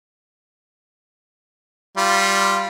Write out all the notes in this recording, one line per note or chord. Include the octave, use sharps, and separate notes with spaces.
G3 F4